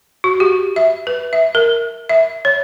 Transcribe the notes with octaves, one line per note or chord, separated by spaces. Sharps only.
F#4
G4
E5
B4
E5
A#4
E5
C#5